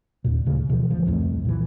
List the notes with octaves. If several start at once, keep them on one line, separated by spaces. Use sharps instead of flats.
D#2 A#2
D2 C#3
B2 E3 F3
G1 D2 F3
C2 F2 A2
A#2 E3